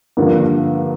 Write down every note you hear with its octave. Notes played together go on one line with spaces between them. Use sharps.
G2 D3 F3 A#3 D4